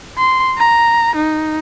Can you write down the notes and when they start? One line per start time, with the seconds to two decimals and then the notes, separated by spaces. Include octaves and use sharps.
0.18 C6
0.58 A#5
1.15 D#4